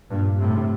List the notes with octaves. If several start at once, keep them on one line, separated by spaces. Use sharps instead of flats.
G2 A#2
A2 C3